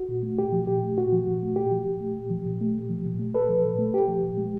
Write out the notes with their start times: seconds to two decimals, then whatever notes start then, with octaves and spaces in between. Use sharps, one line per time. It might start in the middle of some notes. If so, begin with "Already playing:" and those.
Already playing: F#4
0.09 A#2
0.23 A3
0.38 A#2 G4
0.52 F3
0.67 A#2 G4
0.83 A3
0.98 A#2 F#4
1.12 F3
1.27 A#2
1.42 A3
1.56 A#2 G4
1.71 F3
1.86 A#2
2.00 A3
2.16 A#2
2.30 F3
2.46 A#2
2.61 A3
2.75 A#2
2.89 F3
3.05 A#2
3.19 A3
3.34 A#2 A4 B4
3.49 F3
3.64 A#2
3.79 A3
3.93 A#2 G4
4.08 F3
4.23 A#2
4.38 G#3